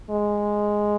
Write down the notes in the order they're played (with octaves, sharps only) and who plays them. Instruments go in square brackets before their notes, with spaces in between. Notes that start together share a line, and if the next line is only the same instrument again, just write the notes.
[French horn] G#3